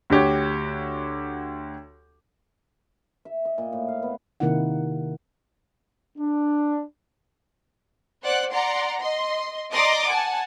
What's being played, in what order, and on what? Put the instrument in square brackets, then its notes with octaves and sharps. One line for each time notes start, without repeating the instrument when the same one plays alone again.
[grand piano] D2 F#4 G4 C#5
[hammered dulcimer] E5
D#5
A#2
A2
F5
B3
[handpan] C3 D#3 A#3 D#4 E4 F#5
[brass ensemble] D4
[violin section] C5 D5 F#5 F#6
D5 F#5 A#5 C6
D#5 C6
D5 D#5 A#5 C6 D6 D#6
F#5 G#5 A5